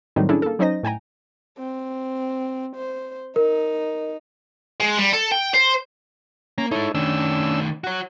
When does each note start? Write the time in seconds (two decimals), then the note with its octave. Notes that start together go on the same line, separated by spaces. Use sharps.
0.16 A2 D#3 F#3 G3 C4 D#4
0.29 C#4 D4 E4 G#4 A4
0.42 A#3 A4
0.59 F#3 C#4 D#4 C5 D#5 A#6
0.83 A2 G5 G#5 A#5
1.58 C4
2.76 C5
3.36 D#4 A#4
4.80 G#3
4.98 G3
5.13 A4
5.32 G5
5.54 C5
6.58 A#3 C#4 A#5
6.71 G#3 D#4 E4 A4 C#5
6.95 D#3 A3 C#4 D4 E6
7.84 F#4 C#5 F#5